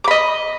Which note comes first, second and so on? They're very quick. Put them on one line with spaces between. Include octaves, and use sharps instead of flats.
D6 B5 D#5